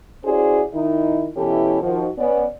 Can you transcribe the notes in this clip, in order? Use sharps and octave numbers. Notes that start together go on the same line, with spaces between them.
C#4 E4 F#4 G#4 C5 D5
D#3 D#4 E4
B2 E3 C#4 E4 G4 A4
D#3 F3 F#4
B3 C#4 D5